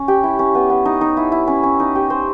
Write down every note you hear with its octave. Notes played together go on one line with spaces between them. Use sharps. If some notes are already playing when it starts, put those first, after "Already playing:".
Already playing: C#4
G4
E4
C#4
B3
B3
D#4
D#4
E4
E4
C#4
C#4
D#4
G4
C5